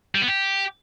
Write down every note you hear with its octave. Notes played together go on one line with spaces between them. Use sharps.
G3
B3
G4